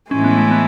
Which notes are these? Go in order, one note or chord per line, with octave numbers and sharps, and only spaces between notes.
A2 E3 G#3 C#4
B3
A3
B3